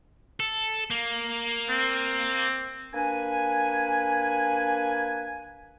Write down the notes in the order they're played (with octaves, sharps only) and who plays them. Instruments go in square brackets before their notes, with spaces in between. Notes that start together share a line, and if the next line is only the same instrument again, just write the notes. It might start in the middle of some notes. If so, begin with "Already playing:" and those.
[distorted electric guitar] A4
A#3
[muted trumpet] C4
[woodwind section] A#3 D4 B4 G#5